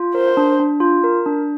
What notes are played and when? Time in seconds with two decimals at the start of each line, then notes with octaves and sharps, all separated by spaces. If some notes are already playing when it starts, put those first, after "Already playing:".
Already playing: F4
0.15 A#4 C5
0.37 D4
0.59 D4
0.80 F4
1.04 A#4
1.26 D4